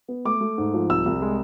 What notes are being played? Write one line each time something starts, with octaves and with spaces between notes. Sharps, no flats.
B3
A3 D6
A3
G#2
F3
C2 E6
C2
G#3